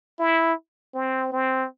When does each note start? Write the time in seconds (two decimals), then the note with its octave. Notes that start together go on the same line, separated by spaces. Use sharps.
0.19 E4
0.94 C4
1.32 C4